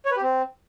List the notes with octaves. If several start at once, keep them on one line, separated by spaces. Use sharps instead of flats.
C#5
B4
G4
C4